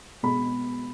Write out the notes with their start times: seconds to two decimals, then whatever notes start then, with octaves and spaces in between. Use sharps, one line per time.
0.23 B2 G#3 B3 B5